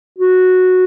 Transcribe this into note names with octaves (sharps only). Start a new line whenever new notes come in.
F#4